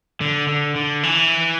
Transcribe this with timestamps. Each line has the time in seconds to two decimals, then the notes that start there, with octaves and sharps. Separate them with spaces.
0.21 D3
0.48 D3
0.76 D3
1.03 E3